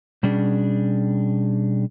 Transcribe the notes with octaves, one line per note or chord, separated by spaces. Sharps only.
B2 G3 C#4 D4 G#4